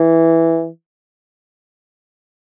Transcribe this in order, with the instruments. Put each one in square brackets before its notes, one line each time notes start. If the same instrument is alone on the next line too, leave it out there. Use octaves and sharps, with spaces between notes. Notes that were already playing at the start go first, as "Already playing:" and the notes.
Already playing: [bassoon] E3